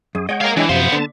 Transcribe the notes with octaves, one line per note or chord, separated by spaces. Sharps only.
F#2 G#4
G#3 C#5 D#5 F#5 G5
A#4 F5
E3 D4
F#2 C3 F3 B3 C5 E5 F5
D3 A5